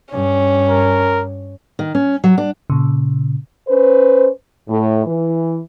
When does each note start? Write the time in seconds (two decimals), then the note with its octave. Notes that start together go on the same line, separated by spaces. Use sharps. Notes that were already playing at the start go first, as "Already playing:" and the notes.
0.12 G2 C#4
0.69 A#4
1.79 D#3
1.95 C#4
2.24 F#3
2.38 D4
2.70 A#2 C#3
3.68 C#4 B4 C5
4.69 A2
5.06 E3